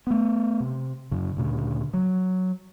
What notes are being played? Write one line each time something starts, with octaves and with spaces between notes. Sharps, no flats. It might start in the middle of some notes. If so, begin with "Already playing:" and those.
A3 B3
C3
F#2 C#3
D2 A#2 C#3
F#3